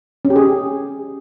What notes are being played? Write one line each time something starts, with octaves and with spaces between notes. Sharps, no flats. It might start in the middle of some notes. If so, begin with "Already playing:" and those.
C#4
G4
G#4